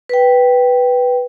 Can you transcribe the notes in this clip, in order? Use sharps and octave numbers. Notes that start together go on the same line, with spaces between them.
B4 G5